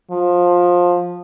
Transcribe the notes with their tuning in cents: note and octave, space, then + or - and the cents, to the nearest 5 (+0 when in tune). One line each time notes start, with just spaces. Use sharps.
F3 +20